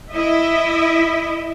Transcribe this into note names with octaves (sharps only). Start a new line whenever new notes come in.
E4 D#5 E5